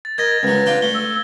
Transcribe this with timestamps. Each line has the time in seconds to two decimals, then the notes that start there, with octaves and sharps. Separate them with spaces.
0.05 A6
0.18 A#4 D#5 G#6 A#6
0.43 C#2 F#3 B4
0.66 D4 F4 G5
0.82 A3 G7
0.94 E6